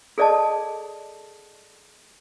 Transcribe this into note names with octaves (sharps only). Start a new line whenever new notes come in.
G#4 A4 D5 D#5 A5